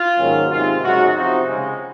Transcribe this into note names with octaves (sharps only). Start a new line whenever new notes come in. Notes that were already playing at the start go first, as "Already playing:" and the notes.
Already playing: F4
G#2 D#3 F#3 A#3 C#4
C3 D#3 G#3 F4
F#2 C#3 G#3 D#4 F#4
C3 F3 C4 D#4 F#4
C#3 G#3 C#4